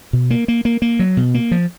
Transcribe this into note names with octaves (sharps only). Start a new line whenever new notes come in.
B2
A#3
A#3
A#3
A#3
F#3
B2
A#3
F3